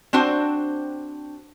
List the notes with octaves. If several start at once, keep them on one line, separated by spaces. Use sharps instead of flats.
C4 D4 F#4 C5